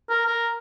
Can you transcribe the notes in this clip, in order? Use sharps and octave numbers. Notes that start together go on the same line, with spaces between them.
A#4
A#4